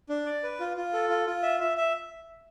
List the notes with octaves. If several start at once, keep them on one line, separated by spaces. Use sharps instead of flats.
D4
D5
B4
F4
F4
A4
F4
F4
E5
E5
E5